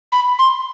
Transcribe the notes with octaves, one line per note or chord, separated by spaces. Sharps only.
B5
C6